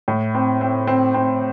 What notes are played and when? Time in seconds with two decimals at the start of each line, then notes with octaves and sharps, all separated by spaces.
0.08 A2
0.35 C4
0.61 C4
0.87 C4
1.14 C4